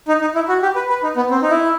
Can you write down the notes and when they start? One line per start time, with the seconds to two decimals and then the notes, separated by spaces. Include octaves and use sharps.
0.08 D#4
0.21 D#4
0.35 E4
0.49 F#4
0.62 G4
0.75 B4
0.89 B4
1.03 D#4
1.16 B3
1.31 C4
1.42 D#4
1.50 E4